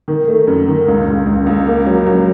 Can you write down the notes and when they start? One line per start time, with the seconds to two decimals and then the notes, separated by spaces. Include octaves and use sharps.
0.08 D#3
0.28 A3
0.47 F#2
0.67 D#3
0.88 C#2
1.08 C#2
1.27 C#2
1.46 C#2
1.67 A#3
1.87 F#3
2.06 F#3